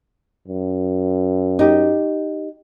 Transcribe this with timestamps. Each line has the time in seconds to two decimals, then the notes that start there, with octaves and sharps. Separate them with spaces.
0.47 F#2
1.59 D#4 G4